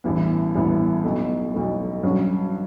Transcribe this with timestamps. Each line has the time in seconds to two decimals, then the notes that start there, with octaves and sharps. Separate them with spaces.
0.04 A1 G2 E3 B3
0.55 A1 G2 E3 B3
1.04 B1 B2 A3
1.54 B1 B2 A3
2.03 G2 F#3 C#4